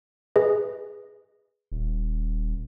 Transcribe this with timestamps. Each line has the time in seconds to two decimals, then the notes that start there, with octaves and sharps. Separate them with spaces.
0.36 G#4 B4 D#5
1.72 D#1